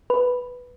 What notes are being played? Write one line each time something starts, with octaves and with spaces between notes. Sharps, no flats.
B4